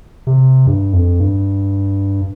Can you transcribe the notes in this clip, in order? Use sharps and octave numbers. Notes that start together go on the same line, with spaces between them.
C3
G2
F2
G2